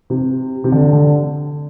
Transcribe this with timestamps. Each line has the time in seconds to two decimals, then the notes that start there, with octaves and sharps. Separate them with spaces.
0.10 C3
0.64 C3
0.72 D3
0.93 D3